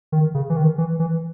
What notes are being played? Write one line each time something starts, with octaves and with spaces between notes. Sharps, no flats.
D#3
C#3
E3
D#3
E3
E3